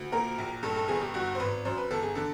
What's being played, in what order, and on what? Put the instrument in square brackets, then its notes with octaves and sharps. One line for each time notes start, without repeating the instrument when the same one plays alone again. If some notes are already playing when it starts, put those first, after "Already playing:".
Already playing: [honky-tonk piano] D2
A#2 A#4
A#1
G2 A4
A4
G1 G#4
G4
G2 F#4
C5
G#1 B4
F#2 C5
B4
G1 A4
G#4
D3 A4